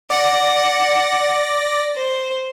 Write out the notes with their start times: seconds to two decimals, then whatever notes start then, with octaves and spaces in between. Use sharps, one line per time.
0.10 D5 F#5 A#6
1.95 C5